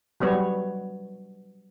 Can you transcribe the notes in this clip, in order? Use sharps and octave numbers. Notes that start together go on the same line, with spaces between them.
F#3 G3 B3 C#5